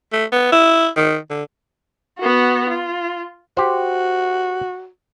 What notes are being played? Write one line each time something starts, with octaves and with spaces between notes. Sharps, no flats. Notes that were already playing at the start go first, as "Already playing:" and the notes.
A3
B3
E4
D#3
D3
B3 F#4
F4
F#4 G4 C5